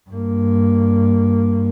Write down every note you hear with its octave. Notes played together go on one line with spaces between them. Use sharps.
G2 A#3